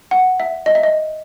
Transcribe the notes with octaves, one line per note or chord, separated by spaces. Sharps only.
F#5
E5
D#5
E5
D#5